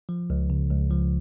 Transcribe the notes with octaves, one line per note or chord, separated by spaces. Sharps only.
F3
C#2
C#3
C#2
F3